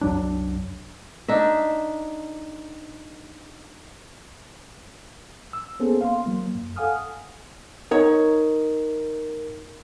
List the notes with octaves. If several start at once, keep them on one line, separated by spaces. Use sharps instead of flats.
C2 F#2 F#3 D4
D4 D#4 E5
E6
A#3 B3 C#4 G#4 A4 C5
F5 C6
F#3 A#3
F#2
A4 F5 F#5 G#5 D#6 F6
D#4 A#4 C#5